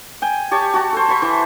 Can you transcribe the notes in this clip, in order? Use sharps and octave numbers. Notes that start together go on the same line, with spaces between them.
G5 G#5
G4 C#5 A5
F#4 A5
A4 C5
C5 B5 C#6
E3